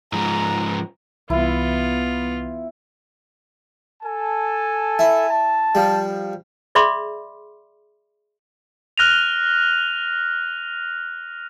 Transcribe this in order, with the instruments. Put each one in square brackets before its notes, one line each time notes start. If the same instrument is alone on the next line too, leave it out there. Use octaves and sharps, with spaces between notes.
[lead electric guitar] G#2 F3 [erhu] A#5
[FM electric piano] C2 E3 [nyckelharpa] B3 F4 [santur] E4
[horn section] A4 G#5 A5
[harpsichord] E4
[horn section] A5
[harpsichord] F3 G3
[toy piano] G#4 D5 E5 B5 C6 D6
[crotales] F6 F#6 A#6 D#7 F7